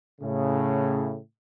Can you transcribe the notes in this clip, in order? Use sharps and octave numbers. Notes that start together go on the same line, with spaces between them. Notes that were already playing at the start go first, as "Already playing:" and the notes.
A2 C#3